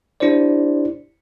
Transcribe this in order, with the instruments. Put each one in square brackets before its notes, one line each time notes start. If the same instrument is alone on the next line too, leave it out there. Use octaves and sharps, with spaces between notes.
[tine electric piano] D4 E4 G4 C5 D5